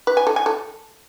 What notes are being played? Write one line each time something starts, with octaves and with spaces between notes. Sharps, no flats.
B4
G#5
A4
G#5
A4